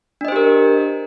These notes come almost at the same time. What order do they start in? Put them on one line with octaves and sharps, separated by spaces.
D4 D#5 C5 G4 A#4